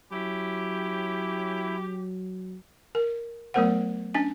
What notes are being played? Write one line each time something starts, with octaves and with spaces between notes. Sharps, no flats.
F#3 C#4 E4 G4
A#4
F#3 A3 B3 A#4 C5 F#5
C#4 D4 G#5